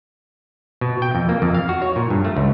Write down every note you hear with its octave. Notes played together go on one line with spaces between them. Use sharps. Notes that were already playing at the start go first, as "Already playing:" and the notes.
B2
G5
F2
A#3
F2
F5
F#4
C#5
A#2
G2
A3
C#2